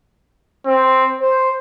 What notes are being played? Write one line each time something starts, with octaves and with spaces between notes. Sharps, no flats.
C4
C5